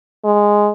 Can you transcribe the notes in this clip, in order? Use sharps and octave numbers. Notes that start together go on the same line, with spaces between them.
G#3